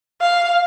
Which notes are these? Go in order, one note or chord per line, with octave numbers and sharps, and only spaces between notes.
F5